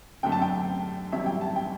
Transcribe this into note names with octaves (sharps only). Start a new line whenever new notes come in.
F#2 D3 A3 G5
A5
G5
A1 G2 F#3 E5
G5
A5
G5